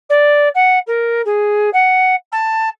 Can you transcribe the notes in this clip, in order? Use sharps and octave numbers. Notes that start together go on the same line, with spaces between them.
D5
F#5
A#4
G#4
F#5
A5